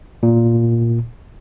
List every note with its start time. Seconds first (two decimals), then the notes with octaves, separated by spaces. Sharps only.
0.23 A#2